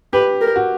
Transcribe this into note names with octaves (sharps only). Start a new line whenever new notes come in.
G4 B4
A#4
F#4